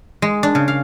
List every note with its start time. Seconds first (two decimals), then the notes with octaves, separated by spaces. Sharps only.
0.22 G#3
0.43 D4
0.55 C#3
0.68 F5